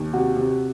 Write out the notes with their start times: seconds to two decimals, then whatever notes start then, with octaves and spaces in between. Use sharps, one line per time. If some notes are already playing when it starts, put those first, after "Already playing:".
Already playing: D#2
0.13 C3 F#4
0.37 C3